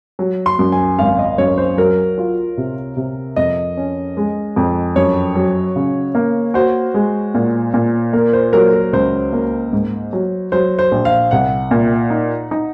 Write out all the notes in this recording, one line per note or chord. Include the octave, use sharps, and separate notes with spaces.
F#3
C6
F#2
G#5
G#1 F5
D#5
F#2 C#5
C5
F#3 A#4
F4
C3
C3
F2 D#5
C#4
G#3
F2
F#2 C#5
F#3
C#3
A#3
F#4 C5
G#3
A#2
A#2
A#3 A#4
C5
F#3 A#4
A#4
C#2 C5
A#3
G#2
F#3
F#3 C5
C5
A#1
F5
C2 F#5
A#2
D#4
D#4